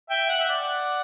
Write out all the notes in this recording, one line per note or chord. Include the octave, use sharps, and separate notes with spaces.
E5 G5
F#5
E5
D5 F#5